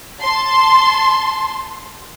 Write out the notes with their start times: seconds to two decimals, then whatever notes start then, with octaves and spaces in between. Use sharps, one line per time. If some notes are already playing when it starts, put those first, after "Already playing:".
0.21 A5 C6